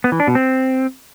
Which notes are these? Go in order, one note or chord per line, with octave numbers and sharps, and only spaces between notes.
B3
E3
D4
B2
C4